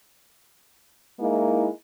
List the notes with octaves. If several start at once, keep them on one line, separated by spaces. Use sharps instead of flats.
G#3 A#3 D#4 E4